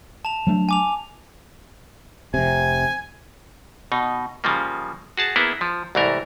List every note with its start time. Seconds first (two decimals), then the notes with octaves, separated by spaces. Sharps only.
0.25 A5 F7
0.47 F#3 A3 D4
0.69 G#5 D6 F7
2.34 F1 C3 G#5
3.92 B2 D#4
4.44 C#3 F3 G3 A#3
5.17 F#4 G#4 A5
5.36 A#3 B3 E4 G#4
5.61 F3
5.95 C2 G#2 E3 A3 A#4